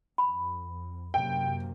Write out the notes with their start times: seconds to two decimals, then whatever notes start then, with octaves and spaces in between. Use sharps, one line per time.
0.18 F2 B5
1.14 F#2 C3 A#3 G5